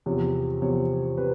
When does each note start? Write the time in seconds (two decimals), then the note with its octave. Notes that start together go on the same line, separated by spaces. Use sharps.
0.06 E2 C3 F3 C#5
0.62 E2 C3 F3 C#5
1.18 C3 B4